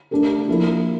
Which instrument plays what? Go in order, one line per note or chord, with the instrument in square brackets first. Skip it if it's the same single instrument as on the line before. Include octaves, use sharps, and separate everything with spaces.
[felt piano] A3 D4 G4 A#4
F3 A#3 E4 A#4